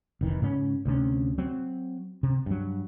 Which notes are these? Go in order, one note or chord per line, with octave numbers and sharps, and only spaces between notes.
F1 D#3 E3
G#2 C#3 C#4
D2 C3 C#4
F#3 C4
C3
G2 F#3